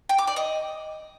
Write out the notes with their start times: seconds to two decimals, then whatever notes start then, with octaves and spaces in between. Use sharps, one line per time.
0.09 G5
0.18 D6
0.27 D5
0.36 D#5